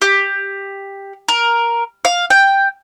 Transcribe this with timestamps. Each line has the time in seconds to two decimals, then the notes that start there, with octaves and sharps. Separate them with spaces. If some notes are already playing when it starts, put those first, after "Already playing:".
0.02 G4
1.28 A#4
2.05 F5
2.30 G5